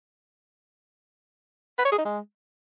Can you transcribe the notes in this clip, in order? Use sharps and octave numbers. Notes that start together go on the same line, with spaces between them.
B4
C#5
G#4
D#4
G#3